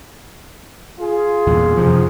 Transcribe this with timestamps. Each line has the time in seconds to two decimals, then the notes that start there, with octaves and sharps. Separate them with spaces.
1.00 F4 G#4
1.47 E2 G2 A#2
1.77 F#2 C3 F3